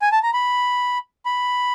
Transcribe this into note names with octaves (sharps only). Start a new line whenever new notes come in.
G#5
A5
A#5
B5
B5